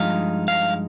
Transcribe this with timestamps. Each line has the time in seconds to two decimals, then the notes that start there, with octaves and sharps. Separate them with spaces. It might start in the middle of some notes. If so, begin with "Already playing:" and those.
Already playing: G2 F3 G#3 D#4 F5
0.48 F5